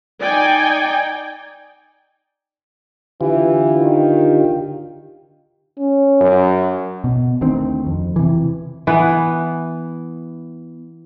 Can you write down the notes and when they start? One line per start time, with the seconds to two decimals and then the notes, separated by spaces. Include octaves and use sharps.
0.21 D#4 D5 G5 G#5
3.21 D3 E3 F4 G4
3.81 D#3
5.79 C#4
6.21 F#2
7.04 B2
7.41 D2 D#3 C4
7.87 F2
8.16 C3 E3
8.87 E3 B3